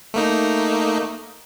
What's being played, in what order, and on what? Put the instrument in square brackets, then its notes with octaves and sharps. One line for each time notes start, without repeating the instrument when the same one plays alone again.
[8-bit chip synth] A3 A#3 D#4